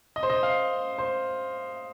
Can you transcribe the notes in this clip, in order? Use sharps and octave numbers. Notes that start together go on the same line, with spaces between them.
D#5
C5
D#5
F5
C5